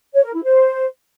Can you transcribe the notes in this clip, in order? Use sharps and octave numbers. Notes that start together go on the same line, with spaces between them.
C#5
A#4
E4
C5